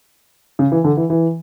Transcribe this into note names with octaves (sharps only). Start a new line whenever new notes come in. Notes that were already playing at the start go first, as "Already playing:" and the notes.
C#3
E3
D3
E3
E3